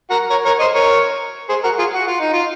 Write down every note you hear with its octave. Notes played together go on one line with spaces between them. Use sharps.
F#4 A#4
A#4 C#5
A#4 C#5
C5 D#5
A#4 C#5
G#4 C5
F#4 A#4
F4 G#4
F#4
F4
D#4
F4